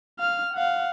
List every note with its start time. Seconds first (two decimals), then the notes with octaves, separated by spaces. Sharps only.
0.19 F5 F6
0.54 F5 F#5